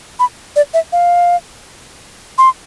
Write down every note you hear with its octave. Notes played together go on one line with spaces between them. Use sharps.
B5
D5
E5
F5
C6